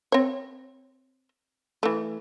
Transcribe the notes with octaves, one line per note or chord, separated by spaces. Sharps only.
C4 C#5
E3 A3